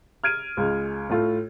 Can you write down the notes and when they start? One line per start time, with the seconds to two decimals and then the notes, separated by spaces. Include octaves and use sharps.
0.24 F6 G#6 D7 D#7
0.57 C#2 G#3
1.10 A2 A3 F4